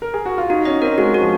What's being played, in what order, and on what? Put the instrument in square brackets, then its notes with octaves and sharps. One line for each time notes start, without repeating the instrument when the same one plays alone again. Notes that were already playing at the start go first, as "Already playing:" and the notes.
[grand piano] A#4
G#4
F#4
F4
[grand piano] D#4 [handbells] F#4
[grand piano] C#4 [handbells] D#5
[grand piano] C4 [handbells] A#4
[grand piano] G#3 [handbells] F#4
[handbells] F#4
[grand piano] F3